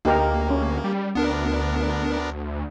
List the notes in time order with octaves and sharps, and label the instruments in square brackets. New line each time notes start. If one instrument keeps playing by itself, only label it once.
[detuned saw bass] D2 [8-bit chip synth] A#3 [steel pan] D#4 G4 A#4
[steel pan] C#4
[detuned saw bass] G3
[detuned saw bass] D2 [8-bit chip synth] B3 D4 A#4